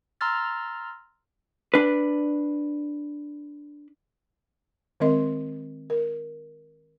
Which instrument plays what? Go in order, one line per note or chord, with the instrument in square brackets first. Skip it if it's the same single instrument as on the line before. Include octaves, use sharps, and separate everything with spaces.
[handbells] A#5 C6 E6 F6 A6
[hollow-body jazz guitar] D4 B4
[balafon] D#3 G#3 C4 A#4 D#5 C6
A#4